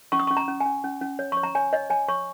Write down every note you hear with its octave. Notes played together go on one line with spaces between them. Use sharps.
C#4 C#6
D#6
C#6
C#4
A#5
C#4
G#5
C#4
C#4
C#4
C#5
C#5 C#6
A#5
C#5 G#5
C#5 D#5
C#5 G#5
C#5 C#6